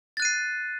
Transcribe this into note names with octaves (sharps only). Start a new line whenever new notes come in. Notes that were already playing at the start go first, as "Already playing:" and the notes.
F#6 A6 C7 D#7